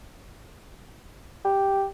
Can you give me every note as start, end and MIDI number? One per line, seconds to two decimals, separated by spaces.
1.44 1.85 67